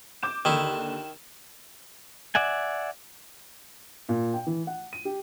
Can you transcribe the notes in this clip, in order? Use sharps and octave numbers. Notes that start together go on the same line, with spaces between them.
D6 G6 E7
D#2 D3 D#3 E4
D5 E5 F#5 G#5
A#2
G5
E3
F#5
D#7
G4